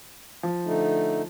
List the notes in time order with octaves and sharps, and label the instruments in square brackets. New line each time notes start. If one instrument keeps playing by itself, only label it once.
[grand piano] F3
[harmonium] D3 A3 D#4